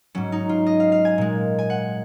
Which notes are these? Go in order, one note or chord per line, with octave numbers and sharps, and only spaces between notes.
G#2 F#3 C#4
D#4
F4
D#5
F5
F5
G#5
A#2 G#3
G#5
F#5